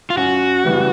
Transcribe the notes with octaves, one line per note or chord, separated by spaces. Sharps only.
F4
F#2 F#4
C#3 E3 G3 B3